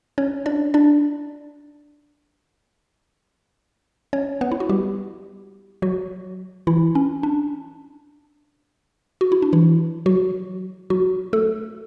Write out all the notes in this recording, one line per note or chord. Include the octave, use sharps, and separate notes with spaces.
C#4 C#5
D4 D5
D4 D5
C#4 C#5
B3 B4
E4
F#4
G3 G4
F#3 F#4
E3 E4
C#4
D4
F#4
E4
D4
E3 E4
F#3 F#4
F#3 F#4
A3 A4